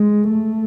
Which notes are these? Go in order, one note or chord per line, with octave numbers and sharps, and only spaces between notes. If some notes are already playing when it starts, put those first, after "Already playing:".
Already playing: G#3
A3